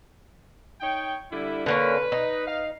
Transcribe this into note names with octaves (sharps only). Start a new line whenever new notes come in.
D#4 C#5 G5
D3 G3 E4
D3 A#3 C#4 B4
D#4
F5